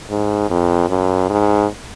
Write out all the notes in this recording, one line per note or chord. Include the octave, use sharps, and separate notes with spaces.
G#2
F2
F#2
G#2